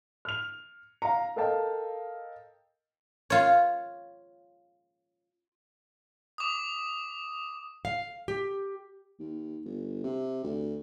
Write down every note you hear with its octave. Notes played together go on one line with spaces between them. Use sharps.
F6 F7
F5 A#5
A4 A#4 D#5 F5 G5 A5
F4 C#5
D6 D#6
F5
G4
D#2
G1
C3
D2